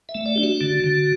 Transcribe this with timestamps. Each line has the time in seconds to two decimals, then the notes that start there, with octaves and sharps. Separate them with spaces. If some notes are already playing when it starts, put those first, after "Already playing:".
0.09 E5
0.15 A3
0.26 D5
0.36 D4 G4
0.43 F#4
0.61 D3
0.84 D3